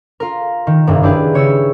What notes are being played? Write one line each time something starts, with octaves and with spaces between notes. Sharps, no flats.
F4 A#4
D#3
F#1 C2 G2
D4 E4 G4 G#4 B4
C#3 C#5 E6